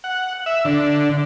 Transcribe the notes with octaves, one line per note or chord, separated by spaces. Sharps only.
F#5
E5
D3